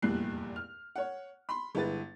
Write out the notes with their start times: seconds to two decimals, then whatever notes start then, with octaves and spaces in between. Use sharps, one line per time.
0.02 F1 E2 G2 A#2 F#6 C7
0.56 F6
0.96 C#5 F#5
1.49 B5 C6
1.75 G1 G#3 E4 B4 A6